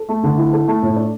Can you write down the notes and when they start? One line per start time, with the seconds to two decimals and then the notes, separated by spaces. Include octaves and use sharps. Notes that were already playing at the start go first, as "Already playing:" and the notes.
Already playing: A4
0.09 A3
0.23 D3
0.37 E4
0.53 A4
0.68 A3
0.83 A2
0.96 D4